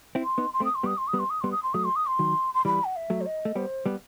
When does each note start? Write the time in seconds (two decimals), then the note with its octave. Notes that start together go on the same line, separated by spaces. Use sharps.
0.15 C4 E4
0.23 C6
0.38 B3 D#4
0.53 C6
0.60 A3 C4
0.64 D#6
0.75 C6
0.83 G3 B3 D#6
0.97 C6
1.07 D#6
1.13 G3 B3
1.19 C6
1.30 D#6
1.41 G3 B3 C6
1.51 D#6
1.62 C6
1.73 F#3 A3 D#6
1.84 C6
1.95 D#6
2.06 C6
2.19 D#3 F#3
2.54 C6
2.65 E3 G3 B5
2.84 F#5
2.96 E5
3.10 F#3 A3
3.21 C5
3.26 D#5
3.45 A3
3.55 G3 B3 C5
3.86 G3 B3 B4